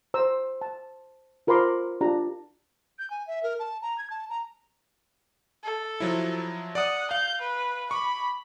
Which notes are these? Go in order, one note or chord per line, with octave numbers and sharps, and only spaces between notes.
C5 A#5 E6
A5
F4 A#4 C5 B5 C6 D6
D4 F4 G4 A#5
G6
G#5
E5
A#4
A5
A#5
G#6
A5
A#5
A4
F3 F#3 E4
D5 F#5 D#6
F5 G6
B4
B5 C#6 D6